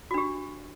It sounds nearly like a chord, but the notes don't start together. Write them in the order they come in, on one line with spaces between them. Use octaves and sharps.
F#4 D4 G4